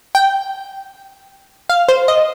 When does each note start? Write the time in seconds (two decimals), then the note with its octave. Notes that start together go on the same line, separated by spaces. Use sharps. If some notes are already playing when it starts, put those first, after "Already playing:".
0.15 G5
1.69 F5
1.89 C5
2.08 D#5